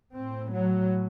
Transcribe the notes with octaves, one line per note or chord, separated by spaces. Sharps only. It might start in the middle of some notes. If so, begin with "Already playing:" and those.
A2 C4
F#3